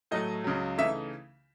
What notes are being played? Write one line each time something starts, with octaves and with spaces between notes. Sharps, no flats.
A2 F#3 A3 D#5
C#2 C#3 F#3
C#3 E3 A3 D#4 E5